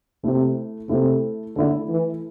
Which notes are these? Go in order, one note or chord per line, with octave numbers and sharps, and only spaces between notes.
C3 A3 E4 A4
C3 A3 E4 A4
D3 A3 E4 A4
E3